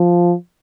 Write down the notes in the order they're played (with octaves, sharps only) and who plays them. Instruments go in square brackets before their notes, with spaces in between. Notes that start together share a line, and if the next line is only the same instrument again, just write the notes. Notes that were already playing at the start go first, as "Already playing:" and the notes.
Already playing: [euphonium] F3